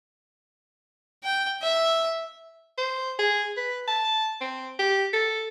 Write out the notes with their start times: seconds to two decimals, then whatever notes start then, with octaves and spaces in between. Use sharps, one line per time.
1.24 G5
1.62 E5
2.77 C5
3.18 G#4
3.57 B4
3.87 A5
4.41 C4
4.79 G4
5.13 A4